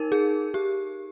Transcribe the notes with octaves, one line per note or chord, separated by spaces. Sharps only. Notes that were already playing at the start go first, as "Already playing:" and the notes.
Already playing: D#4 A#4
G#4
G4